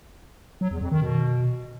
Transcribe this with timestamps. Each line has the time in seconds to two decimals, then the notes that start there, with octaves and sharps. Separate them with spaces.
0.61 F#3
0.71 E2
0.81 F2
0.92 D#3
1.02 B2